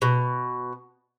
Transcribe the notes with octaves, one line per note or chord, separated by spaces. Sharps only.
B2